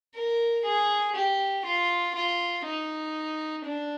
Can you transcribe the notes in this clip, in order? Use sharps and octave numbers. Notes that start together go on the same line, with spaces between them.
A#4
G#4
G4
F4
F4
D#4
D4